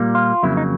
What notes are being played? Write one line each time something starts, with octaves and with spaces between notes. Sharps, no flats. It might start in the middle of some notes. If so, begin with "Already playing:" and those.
Already playing: A#2 G3 A#3
F4
F2 C#3 F#3 A#3 E4
D#4